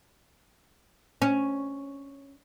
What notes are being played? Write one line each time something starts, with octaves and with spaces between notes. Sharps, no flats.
C#4